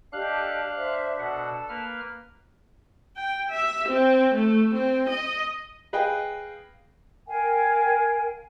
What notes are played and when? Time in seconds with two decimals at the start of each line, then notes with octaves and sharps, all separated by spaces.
0.13 D4 G4 A4 D#5 F5 F#6
0.76 C5 E5
1.19 B2 A4 F#5
1.69 A#3 B4 F6
3.17 G5
3.51 E5
3.89 C4
4.35 A3
4.75 C4
5.10 D#5
5.93 G#4 B4 D#5 F5 G5
7.28 A#4 F5 G5 G#5